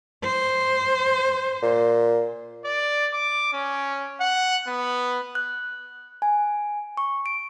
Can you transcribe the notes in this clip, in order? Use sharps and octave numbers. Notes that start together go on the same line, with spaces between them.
C5
A#2
D5
D6
C#4
F#5
B3
F#6
G#5
C#6
D7